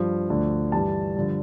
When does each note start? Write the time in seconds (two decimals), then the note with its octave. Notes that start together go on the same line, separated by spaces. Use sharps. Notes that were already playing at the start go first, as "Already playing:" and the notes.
Already playing: G2 F3
0.30 D2 D3 F3
0.72 G2 E3 G3 A5
1.16 G2 D3 F3